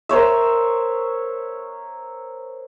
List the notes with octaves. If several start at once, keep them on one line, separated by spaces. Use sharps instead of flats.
A#4 C5 C#5 E5